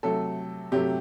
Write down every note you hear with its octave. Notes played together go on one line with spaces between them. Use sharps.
C3 F#3 A3 A4
C3 F#3 A3 G4